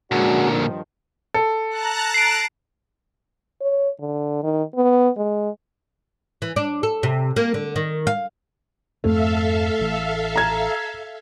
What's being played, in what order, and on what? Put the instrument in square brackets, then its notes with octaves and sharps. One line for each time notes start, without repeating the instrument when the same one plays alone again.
[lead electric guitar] A#2 D3 [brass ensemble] G#3 C#4 F#4
[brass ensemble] G2 D#3 F3
[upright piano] A4
[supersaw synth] A5 A#5 F#6
[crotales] C7 D7
[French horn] C#5
D3
D#3
B3
G#3
[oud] E3
D4
A4
C3
A#3
D3
D#3
F5
[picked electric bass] F2 G#2 C4 [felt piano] A3 [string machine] A4 E5 F5
[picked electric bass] A1 E3
[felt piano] A#5 G#6